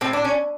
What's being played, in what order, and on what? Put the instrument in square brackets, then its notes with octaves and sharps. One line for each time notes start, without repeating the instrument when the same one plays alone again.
[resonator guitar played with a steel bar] A2 C4
D4
C#4